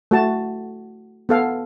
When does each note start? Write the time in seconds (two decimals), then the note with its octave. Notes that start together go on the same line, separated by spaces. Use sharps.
0.11 A3 F#4 A5
1.29 B3 A4 F5